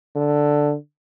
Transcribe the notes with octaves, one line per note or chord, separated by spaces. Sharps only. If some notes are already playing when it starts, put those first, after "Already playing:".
D3